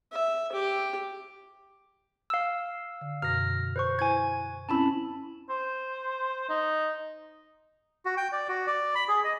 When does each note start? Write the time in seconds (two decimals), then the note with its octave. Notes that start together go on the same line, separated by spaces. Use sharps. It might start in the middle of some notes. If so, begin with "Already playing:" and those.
0.12 E5
0.53 G4
2.30 F5 E6
3.01 D3
3.22 F#2 B2 F6 A#6
3.76 B4 C5 C#6
3.99 E4 C5 G#5 G#6
4.69 C4 C#4 E4 A5 B5
5.50 C5
6.49 D#4
8.05 F#4
8.17 G5
8.32 D5
8.49 F#4
8.67 D5
8.95 B5
9.08 G#4
9.24 D#5